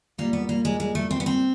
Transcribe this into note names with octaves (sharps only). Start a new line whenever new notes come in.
A#2 G3 A#3
B3
A#3
G#3
G#3
A3
C4
B3
C4